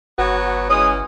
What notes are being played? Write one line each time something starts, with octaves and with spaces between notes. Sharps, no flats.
G1 F#3 B3 F#4
E3 G#3 C#4 D#6